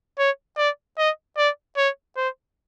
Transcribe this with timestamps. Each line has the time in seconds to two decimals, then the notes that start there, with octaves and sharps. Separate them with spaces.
0.19 C#5
0.58 D5
0.98 D#5
1.38 D5
1.77 C#5
2.17 C5